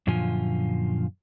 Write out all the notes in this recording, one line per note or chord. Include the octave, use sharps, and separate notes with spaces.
F#2 A#2 D3 F3 F4 G#5